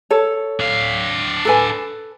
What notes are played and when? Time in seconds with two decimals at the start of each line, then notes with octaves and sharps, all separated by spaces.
0.10 A4 C#5
0.60 D4 F5
1.45 A4 B4 G#5